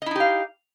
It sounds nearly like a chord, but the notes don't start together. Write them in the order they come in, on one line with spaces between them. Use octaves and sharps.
D#5 E4 D#4 G4 F5